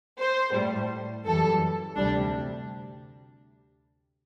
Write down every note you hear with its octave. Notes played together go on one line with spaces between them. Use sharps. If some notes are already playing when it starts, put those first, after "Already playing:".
C5
A2 G3
F#2 E3 G3 A4
D2 C3 G3 D4